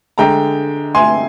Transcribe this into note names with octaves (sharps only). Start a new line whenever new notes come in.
D3 G#3 G5 A#5
G#5 C6